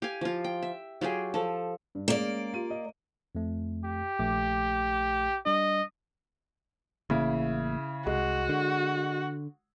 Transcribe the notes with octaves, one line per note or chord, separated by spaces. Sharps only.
G4 F5 G#5
F3 F4
G5
E5
F#3 F4 G4 G#4
F3 A4
G2
G#3 A#3 C#4 G#4 D5
F4 G4 D#7
D#5
F2 A3
G4
A#1 A3 D6
G3 D4 D#5
A1 C#3 A#3 E4
C2 G#3 F#4
D3